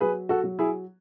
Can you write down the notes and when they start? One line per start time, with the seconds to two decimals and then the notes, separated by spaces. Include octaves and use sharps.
0.01 F#3 G#4 B4
0.29 F#4 A4
0.44 F#3
0.59 E4 G#4